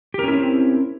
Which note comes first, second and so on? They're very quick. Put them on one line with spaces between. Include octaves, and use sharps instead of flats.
G4 A#4 C#4 E4 C4